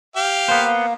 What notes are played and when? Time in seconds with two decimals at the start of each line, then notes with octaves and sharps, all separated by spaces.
0.16 G4 F5
0.48 A#3 B3 C5